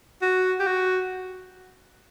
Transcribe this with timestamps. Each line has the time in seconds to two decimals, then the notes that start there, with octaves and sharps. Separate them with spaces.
0.22 F#4
0.60 G4
0.67 F#4